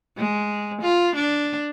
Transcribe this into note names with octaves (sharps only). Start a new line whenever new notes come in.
G#3
F4
D4